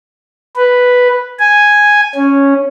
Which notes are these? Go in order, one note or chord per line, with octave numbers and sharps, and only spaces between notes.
B4
G#5
C#4